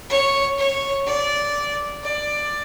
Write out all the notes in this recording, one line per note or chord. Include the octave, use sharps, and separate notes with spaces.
C#5
C#5
D5
D5